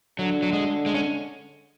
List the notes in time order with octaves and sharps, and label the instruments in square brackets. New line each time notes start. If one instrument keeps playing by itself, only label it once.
[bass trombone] D3 [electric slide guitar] F#3
[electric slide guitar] F#3
G#3
G#3
C#4